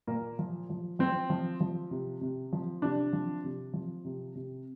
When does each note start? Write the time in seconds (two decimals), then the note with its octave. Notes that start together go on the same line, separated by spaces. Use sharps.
0.07 A#2 A#3
0.39 F3
0.70 F3
0.99 F3 C4
1.30 F3
1.61 F3
1.91 C3
2.21 C3
2.53 F3
2.82 C3 D4
3.13 F3
3.44 C3
3.73 F3
4.05 C3
4.35 C3